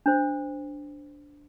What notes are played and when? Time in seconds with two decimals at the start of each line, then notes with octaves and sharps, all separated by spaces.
0.06 D4 C5